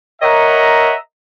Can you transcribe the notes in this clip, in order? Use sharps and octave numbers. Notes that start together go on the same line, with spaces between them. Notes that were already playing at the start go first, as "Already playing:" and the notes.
A#4 C#5 D#5 E5 F#5 A#5